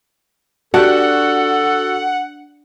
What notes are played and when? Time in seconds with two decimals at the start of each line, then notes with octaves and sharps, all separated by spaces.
0.74 D4 F#4 G4 A4 F#5